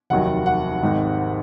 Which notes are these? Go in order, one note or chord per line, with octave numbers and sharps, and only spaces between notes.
F1 D#2 D#3 F#3 F#5
F#5
G#1 G#2 D#3 G#3